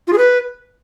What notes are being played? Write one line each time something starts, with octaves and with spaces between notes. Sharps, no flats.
F4
G#4
B4